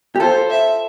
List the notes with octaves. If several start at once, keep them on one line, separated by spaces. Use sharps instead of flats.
G4
F4 A4 C5
E5